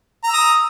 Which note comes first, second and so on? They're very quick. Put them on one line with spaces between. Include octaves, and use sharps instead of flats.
A#5 E6 D#6